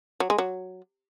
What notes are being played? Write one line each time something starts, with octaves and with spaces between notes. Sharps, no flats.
F#3
G#3
F#3